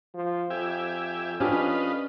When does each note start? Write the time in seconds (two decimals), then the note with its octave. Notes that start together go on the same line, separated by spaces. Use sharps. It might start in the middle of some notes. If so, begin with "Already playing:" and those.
0.14 F3
0.50 F2 G4 E5 G#5
1.40 C#4 D4 F4 G4 B4 D#5